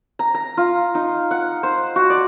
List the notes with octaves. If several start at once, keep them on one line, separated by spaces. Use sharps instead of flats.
A#5
A#5
F4
D#4
F#5
C5
F#4
D5